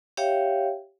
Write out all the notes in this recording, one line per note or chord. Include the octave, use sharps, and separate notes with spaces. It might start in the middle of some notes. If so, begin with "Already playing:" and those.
G4 C#5 E5 F5 G5